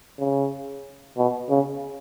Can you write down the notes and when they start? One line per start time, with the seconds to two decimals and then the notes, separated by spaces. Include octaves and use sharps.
0.18 C#3
1.17 B2
1.50 C#3